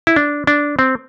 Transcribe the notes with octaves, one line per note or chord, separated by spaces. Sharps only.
E4
D4
D4
C4